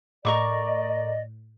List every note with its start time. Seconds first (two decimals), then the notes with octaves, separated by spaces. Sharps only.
0.25 A2 A#4 D5 D#5 C#6 D6